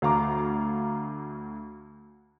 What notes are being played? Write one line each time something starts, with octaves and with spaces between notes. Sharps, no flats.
D2 F5 A#5 D6